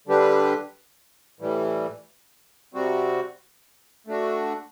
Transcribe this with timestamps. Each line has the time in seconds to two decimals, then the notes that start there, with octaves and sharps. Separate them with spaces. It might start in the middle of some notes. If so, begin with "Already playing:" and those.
0.07 D3 G3 D4 G4 B4
1.40 A2 E3 G3
2.74 C3 G3 C4 F#4
4.07 A3 D4 F#4